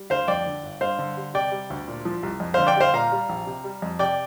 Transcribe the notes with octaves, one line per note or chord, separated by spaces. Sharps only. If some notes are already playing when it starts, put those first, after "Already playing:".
Already playing: G3
D2 C5 F5
F2 D5 G5
D3
G1
G2 C5 F5
D3
G3
C3 D5 G5
G3
D2
A#2
F3
C2
F2
D3 C5 F5
D5 G5
G3 C5 F5
A#2 F5 A#5
G3
A#1
C3
G3
F2
C3 D5 G5